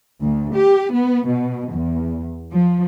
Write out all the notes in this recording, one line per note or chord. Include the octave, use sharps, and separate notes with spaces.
D2
G4
B3
B2
E2
F3